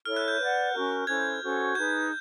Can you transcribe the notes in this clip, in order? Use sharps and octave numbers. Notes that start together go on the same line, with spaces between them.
E4 A4 C#5 F6
F#6
G6
B4 D5 F#5
C#4 F#4 A#4
C#4 E4 A4 C5 G#6
C#4 F#4 A4 C5
D#4 G#4 B4 G6